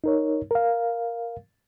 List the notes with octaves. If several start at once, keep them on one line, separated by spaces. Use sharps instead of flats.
D#4 A#4 C#5
A#4 F5